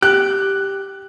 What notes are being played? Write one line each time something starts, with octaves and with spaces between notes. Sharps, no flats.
G4 F#6